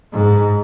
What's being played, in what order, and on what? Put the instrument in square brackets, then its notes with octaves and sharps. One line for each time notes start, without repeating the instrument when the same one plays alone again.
[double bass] G#2